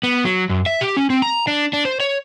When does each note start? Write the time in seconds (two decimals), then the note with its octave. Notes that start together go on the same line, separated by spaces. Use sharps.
0.03 B3
0.25 F#3
0.50 F#2
0.66 E5
0.81 G4
0.97 C#4
1.10 C4
1.22 A#5
1.48 D4
1.73 D4
1.85 C5
2.00 C#5